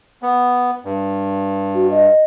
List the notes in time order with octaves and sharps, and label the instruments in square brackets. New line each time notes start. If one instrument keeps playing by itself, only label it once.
[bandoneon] B3
G2
[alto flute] F#4
D#5